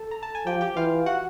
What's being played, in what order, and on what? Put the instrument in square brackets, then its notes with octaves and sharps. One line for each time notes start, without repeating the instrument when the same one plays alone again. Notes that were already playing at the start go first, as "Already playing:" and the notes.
Already playing: [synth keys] A4 A5
A#5
A5
G#5
[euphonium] F3 [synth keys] G4 G5
[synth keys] G4 G5
[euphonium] E3 [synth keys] F4 F5
[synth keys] F#4 F#5